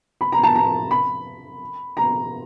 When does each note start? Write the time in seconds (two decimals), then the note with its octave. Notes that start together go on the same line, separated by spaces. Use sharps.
0.21 B5
0.32 A#5
0.43 A5
0.55 A#5
0.91 B5
1.97 A#5